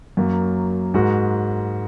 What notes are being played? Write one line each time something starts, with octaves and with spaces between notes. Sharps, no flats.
F#2 F#3 A#3
G#2 G#3 F#4 A#4